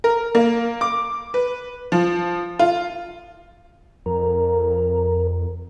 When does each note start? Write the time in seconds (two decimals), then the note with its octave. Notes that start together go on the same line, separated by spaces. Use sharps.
0.04 A#4
0.35 A#3
0.81 D6
1.34 B4
1.92 F3
2.59 F4
4.06 F2 A#4